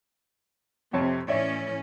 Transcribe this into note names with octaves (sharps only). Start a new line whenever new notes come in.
F2 C3 C#5 A5
A2 E3 C#4 C#5 D5 E5